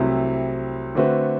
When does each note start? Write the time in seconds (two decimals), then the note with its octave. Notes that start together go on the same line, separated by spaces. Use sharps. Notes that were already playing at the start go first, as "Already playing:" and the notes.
Already playing: C2 C3 F#3 A3 E4
0.95 D3 A3 C4 F#4 B4